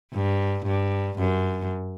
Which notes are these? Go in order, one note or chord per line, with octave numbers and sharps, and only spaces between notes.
G2
G2
F#2